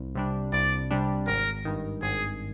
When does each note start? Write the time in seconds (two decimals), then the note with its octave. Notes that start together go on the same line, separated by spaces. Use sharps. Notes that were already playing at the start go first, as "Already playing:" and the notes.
Already playing: C2
0.15 C3 G3 D4
0.53 C2 D5
0.91 C3 G3 D4
1.27 G#1 A#4
1.65 G2 D#3
2.02 G#1 G#4